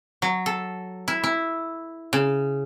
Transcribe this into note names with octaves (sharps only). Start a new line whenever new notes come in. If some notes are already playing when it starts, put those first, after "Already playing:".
F#3
A4
E4
E4
C#3